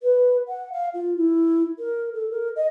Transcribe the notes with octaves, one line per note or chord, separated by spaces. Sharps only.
B4
F#5
F5
F4
E4
A#4
A4
A#4
D#5